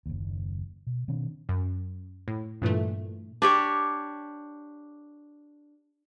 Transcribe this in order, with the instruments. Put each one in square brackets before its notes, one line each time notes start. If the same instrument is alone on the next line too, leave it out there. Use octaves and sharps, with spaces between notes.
[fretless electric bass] F#1 D#2
B2
B2 D#3 C4 D4
[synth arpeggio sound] F#2
A2
G2 A#2 E3 A3
[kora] D4 G4 C#5